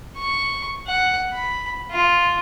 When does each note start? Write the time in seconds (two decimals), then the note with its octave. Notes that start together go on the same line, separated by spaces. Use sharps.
0.17 C#6
0.87 F#5
1.33 B5
1.91 F4